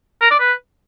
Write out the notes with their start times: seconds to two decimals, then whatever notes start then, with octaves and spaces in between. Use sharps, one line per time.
0.21 A#4
0.31 D5
0.40 B4